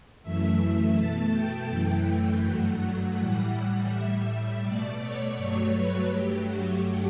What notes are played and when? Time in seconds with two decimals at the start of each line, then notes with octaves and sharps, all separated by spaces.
0.22 F#2 E3 A3 E5
0.96 B2 A3 A5
1.33 G5
1.70 F#2 E3 A3
2.42 G2 F#3 A3 F#5
3.15 A2 E3 G3 F#5
3.53 F#5
3.89 A2 G3 E5
4.62 B2 A3 D5
5.00 C#5
5.36 G2 F#3 A3 C#5
5.73 B4
6.09 G2 F#3 A3 G4
6.46 F#4